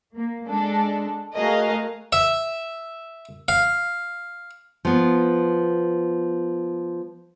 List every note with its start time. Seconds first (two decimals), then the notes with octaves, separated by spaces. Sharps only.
0.16 A#3
0.48 G#3 D4 A4
1.36 A3 F#4 G#4 A#4 D#5 F5
2.13 E5
3.48 F5
4.85 F3 B3